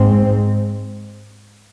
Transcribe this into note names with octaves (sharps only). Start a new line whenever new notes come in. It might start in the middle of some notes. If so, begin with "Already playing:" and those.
Already playing: G#2 G#3 C4